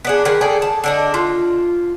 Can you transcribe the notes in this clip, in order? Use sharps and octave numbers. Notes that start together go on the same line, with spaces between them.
B3 D4 G#4
D#3 G#4 A#4 B4
G#4 A4 D5 G5
A5
D3 D4 D#5
F4